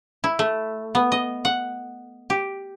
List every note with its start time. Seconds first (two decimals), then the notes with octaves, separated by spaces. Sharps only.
0.24 E4
0.39 A3
0.95 B3
1.12 D#5
1.45 F#5
2.30 G4